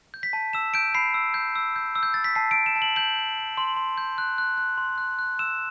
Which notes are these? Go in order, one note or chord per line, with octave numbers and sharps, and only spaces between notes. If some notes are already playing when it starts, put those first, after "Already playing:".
G6
B6
A5
E6 E7
G6 D7
B5 C7
E6
G6
E6
G6
E6
G6
G6 A6
B6
A5 C7
D7
E6
E7
A5
F#7
G6 F#7
G6
G6
C6
C6
G6
F#6
F#6
F#6
C6
F#6
F#6
E6 E7